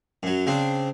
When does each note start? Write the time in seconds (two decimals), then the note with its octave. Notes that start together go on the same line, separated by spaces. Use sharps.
0.23 F#2 F#3
0.46 C#3 C4 D4